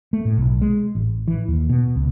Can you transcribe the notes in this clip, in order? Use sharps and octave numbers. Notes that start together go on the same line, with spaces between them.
A3
A2
B1
G#3
A1
E3
D#2
B2
C#2